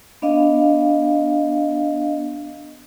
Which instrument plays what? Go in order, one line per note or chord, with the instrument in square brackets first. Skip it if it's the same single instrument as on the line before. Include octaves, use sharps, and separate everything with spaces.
[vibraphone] B3 D4 D#5 F5